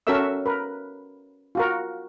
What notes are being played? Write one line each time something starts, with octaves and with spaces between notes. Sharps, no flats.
C#4 F#4 A4 A#4 E5 E6
A#4 B4
F4 F#4 A#4